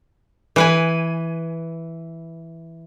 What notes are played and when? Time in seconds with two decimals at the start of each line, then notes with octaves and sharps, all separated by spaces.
0.56 E3 B4 G#5